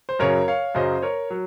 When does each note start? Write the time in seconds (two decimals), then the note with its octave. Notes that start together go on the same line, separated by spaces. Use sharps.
0.09 C5
0.19 F#2 C#3 F#3 A#4 C#5
0.48 C#5 F5
0.75 F#2 C#3 F#3 C5 D#5
1.02 A#4 C#5
1.30 F#3